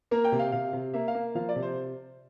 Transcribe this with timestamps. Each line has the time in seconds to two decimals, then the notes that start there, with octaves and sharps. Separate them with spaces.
0.11 A#3 A#4
0.25 G5
0.32 C3
0.39 F5
0.52 C3 F5
0.73 C3
0.94 A#3 E5
1.08 F5
1.15 A#3
1.35 F3 F5
1.49 D5
1.56 C3
1.62 C5